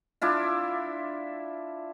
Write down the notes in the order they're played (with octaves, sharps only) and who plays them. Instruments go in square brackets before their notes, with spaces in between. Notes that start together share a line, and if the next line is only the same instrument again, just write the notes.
[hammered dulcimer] D4 E4 F4